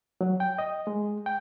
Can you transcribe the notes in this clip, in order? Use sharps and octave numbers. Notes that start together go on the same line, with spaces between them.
F#3
G5
D#5
G#3
G5